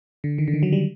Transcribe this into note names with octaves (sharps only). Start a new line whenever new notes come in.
D3
D#3
D3
D#3
F#3
G3